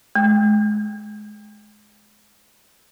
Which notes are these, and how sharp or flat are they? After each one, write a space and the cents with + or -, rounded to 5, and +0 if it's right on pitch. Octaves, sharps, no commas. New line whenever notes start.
G#3 +25